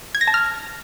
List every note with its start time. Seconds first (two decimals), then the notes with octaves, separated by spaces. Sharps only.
0.15 G#6
0.21 A#6
0.28 A5
0.34 F6